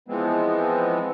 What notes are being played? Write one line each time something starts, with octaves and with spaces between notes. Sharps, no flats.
E3 F3 G#3 B3 C4